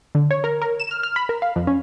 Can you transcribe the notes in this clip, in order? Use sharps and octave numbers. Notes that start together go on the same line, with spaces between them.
D3
C#5
A#4
A#4
E7
F6
F6
B5
A#4
F5
F2
C#4